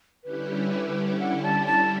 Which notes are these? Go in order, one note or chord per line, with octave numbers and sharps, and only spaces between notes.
D3 G3 C#4 E4 G4 B4
F#5
A5
A5